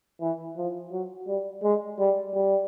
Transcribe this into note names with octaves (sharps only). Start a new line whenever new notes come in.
E3
F3
F#3
G3
G#3
G3
G3